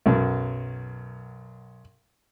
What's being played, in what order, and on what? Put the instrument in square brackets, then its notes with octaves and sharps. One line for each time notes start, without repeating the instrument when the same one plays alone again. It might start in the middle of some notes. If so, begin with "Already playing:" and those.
[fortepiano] B1 F#2